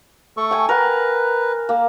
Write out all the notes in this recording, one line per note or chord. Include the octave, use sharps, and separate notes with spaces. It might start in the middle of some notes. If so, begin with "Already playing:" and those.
A3 A4 C#6
G5 G#5
A#4 B4 F#5
A#3